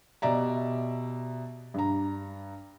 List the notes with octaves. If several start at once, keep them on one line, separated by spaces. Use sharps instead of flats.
B2 G4 D5 E5 A#5
G2 A#5